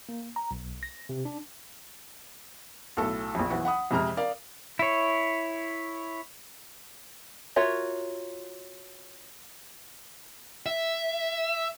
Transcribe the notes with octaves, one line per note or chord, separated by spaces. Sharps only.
A#3
A#5
B1
A#6
C3
D4
B1 A2 A4
A#1 F2
B1 E3 F#4
F#5 B5 D#6
F2 C3 G#3 A#5 F6
A#4 D5 F5
E4 C#5
F4 F#4 A#4 C#5 E5
E5